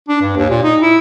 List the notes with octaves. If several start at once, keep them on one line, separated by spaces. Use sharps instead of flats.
D4
G2
D#2
A#2
D#4
E4